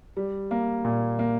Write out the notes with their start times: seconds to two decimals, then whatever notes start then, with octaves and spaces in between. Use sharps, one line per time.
0.17 G3
0.51 A#3
0.85 A#2
1.19 A#3